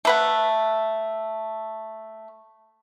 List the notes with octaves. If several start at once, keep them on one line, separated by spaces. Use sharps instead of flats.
A3 B4 F#5